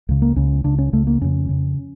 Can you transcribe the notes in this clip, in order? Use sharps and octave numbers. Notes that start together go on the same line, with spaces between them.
C#2 C#3
A#3
C#2 C#3 C#4
C#2 C#3 D4
C#4
C#2 C#3 A3
A#3
F2 C#3 C#4
F2 C#3